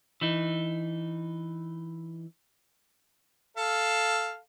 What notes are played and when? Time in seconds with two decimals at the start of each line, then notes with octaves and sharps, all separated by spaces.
0.21 E3 D#4
3.57 A4 F5